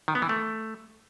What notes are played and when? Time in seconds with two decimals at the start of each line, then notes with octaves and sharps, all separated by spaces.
0.08 D#3
0.15 B3
0.22 E3
0.29 A3